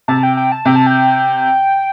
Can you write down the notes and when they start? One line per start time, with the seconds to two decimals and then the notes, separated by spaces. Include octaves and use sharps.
0.08 C3 A5
0.23 G5
0.37 G5
0.52 A5
0.65 C3 G5
0.76 A5
0.87 G5